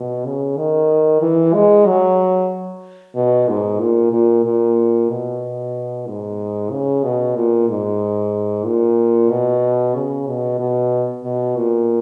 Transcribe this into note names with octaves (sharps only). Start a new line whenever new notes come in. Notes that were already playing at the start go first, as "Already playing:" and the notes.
Already playing: B2
C#3
D#3
E3
G#3
F#3
B2
G#2
A#2
A#2
A#2
B2
G#2
C#3
B2
A#2
G#2
A#2
B2
C#3
B2
B2
B2
A#2